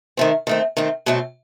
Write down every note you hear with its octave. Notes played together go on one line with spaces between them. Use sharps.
D#3 A3 C4
D#3 A3 C4
D#3 A3 C4
B2 F#3 A3 C4